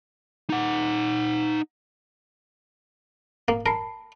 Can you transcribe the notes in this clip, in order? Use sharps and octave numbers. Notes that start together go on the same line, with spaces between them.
D#4 F#5
A#3
A#4 A5 B5 C7